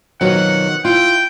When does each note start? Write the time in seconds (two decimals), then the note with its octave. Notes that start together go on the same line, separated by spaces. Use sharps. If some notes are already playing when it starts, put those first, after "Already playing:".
0.21 F2 B2 D#3 F#3 F#5
0.85 E4 F4 G5